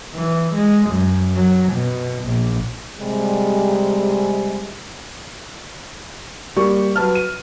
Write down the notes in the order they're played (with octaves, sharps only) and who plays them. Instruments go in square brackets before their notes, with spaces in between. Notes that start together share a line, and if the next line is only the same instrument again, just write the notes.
[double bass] E3
G#3
F#2
F#3
B2
A#1
[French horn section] C3 G3 G#3
[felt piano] G3 A#3 G4 D5 C#6
F#3 B4 A5 F6
D#7